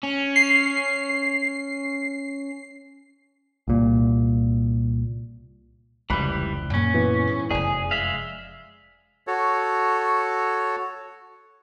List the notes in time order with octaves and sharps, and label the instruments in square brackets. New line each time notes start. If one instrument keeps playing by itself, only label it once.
[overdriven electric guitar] C#4
[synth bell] C7
[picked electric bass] C2 A#2
[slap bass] F1 C#2 [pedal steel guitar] E3 G3 [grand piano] B5 F#6
[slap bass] F#2 A#2 A#3 [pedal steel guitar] C#4
[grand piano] E3 B3
[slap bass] G#2
[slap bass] F1 F#2 [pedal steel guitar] G#4 [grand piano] D5 G#5
[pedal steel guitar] G#3 E5 F5
[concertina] F#4 A4 C#5